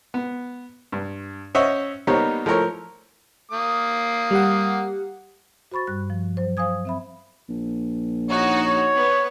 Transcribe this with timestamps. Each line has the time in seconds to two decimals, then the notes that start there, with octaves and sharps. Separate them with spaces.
0.14 B3
0.92 G2
1.55 C#4 C5 C#5 D#5 E5 F#5
2.07 G3 A#3 B3 D#4 C5 C#5
2.46 F3 A3 E4 A#4 C#5
3.51 A#3 D#6
4.31 G3 G4 F#5
5.72 F#4 C5 B5 C#6 A6
5.87 G2 G3 F#6
6.10 F3
6.37 F#3 C5
6.57 C5 F5 G#5 D#6 G#6
6.85 C4 E5 B5
7.49 A#1
8.29 D#4 F#4 C#5
8.64 C#5
8.96 B3